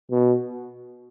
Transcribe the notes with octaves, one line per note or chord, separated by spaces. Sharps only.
B2